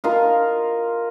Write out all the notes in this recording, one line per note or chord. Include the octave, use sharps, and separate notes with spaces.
F4 A#4 D#5 F5